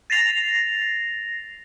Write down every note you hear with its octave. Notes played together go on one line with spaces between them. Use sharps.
A6 A#6 C7 F7